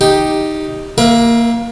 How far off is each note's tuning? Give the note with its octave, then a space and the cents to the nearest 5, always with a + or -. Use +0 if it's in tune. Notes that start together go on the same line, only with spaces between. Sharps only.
D#4 +0 G4 +0
A#3 -5 A#4 +40 E5 +0